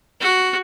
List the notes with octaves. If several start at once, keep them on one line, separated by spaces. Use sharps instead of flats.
F#4